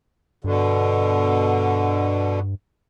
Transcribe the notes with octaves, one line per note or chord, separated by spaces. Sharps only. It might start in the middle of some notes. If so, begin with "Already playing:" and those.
G2 B2 D3